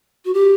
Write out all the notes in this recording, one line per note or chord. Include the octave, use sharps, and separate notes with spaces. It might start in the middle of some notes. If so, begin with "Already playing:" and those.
F#4
G4